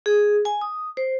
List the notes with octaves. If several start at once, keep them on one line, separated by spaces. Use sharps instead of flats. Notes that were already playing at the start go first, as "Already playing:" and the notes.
G#4
G#5
D#6
C5